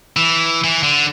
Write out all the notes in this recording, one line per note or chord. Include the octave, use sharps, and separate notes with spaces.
E3
E3
D3